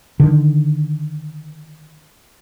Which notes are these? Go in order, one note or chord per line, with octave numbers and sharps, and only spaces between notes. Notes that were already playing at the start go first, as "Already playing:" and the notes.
D3 D#3